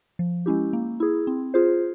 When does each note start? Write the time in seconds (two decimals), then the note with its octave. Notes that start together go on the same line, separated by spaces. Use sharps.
0.19 F3
0.46 G#3 C#4 E4 G4
0.73 A#3
1.00 E4 G#4
1.27 C4
1.54 F4 G#4 C5